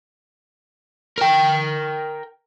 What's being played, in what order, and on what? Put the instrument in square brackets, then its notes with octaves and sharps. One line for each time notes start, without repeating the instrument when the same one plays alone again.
[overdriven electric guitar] A#4 G5